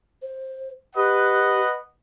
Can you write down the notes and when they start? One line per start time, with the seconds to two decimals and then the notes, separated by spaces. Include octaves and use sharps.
0.22 C5
0.96 G4 B4 D#5 F#5